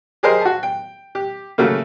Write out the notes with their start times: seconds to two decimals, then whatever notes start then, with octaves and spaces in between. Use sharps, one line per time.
0.23 G4 G#4 A#4 C5 D#5
0.41 F#4 A5
0.63 G5
1.15 G4
1.58 C#3 F#3 A3 A#3